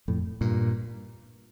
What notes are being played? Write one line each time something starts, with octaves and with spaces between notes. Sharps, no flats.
F2 A2
G2 A#2